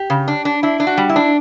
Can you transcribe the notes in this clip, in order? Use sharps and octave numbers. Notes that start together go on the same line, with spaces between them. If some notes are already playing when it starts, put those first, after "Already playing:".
Already playing: G4
C#3
D4
D4
D4 E4
D4
F#4
G3
E4
D4